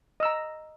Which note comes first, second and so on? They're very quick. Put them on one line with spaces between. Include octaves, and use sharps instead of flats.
D#5 E6 A#5